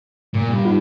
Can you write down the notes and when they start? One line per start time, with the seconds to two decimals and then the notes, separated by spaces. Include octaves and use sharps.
0.34 A#2
0.49 G2
0.63 D#4 F4 F#5